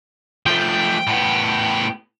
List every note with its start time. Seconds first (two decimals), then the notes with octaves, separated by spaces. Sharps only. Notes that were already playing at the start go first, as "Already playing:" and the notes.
0.46 F3 A3 G5
1.07 A2 B3